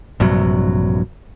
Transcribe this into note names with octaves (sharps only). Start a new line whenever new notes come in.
A#1 G2 C3 F#3